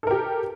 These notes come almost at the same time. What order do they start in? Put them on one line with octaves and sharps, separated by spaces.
A4 A#4 G4